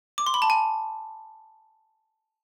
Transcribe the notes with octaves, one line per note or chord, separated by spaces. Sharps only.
D6
C6
B5
A5
G#5